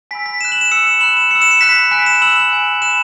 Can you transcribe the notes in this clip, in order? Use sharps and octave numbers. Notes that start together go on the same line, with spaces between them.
G#5 B5 E6 B6
B6
B5 F#6 E7
F#7
E7
B5 E6 C#7
E7
B5 F#6 F#7
E7
B5 E6 C#7
E7
C#7
B5 F#6 B6
G#5 B5 F#6 B6
E7
B5 E6 F#7
F#7
G#5 E6
B5 F#6 E7